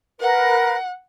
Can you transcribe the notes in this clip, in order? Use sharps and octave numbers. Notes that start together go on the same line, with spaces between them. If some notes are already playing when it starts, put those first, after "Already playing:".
A#4 B4 F#5